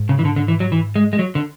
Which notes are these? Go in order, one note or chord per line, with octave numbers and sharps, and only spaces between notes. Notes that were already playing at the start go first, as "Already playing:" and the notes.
Already playing: G#2
C#3
E3
D3
D3
E3
F#3
E3
G#3
G#3
F#3
D3